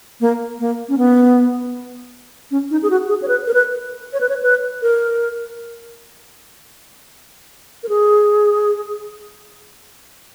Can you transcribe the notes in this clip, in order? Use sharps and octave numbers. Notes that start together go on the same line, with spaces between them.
A#3
A#3
C#4
B3
C#4
D#4
G#4
F#4
G#4
C#5
B4
A#4
B4
C#5
B4
C#5
B4
A#4
A#4
G#4